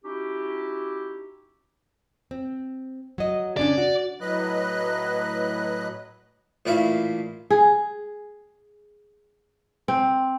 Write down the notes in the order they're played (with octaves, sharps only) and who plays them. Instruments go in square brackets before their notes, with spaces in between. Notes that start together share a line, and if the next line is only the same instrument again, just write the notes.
[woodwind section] C#4 D#4 E4 F#4 G4
[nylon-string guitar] C4
F#3 D#5
[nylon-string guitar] C#3 C#4 D4 [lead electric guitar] D5
[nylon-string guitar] F#4
[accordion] A2 F#3 B4 D#5 F#6
[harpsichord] A1 A#2 E4 E5 F5
[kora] G#4
C4